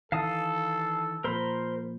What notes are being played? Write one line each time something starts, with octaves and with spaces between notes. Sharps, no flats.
D#3 E3 A4 F5 A5 D#6
A#2 F3 A#4 C5 B5